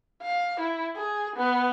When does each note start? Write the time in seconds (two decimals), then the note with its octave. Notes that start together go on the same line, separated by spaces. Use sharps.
0.22 F5
0.60 E4
0.96 G#4
1.36 B3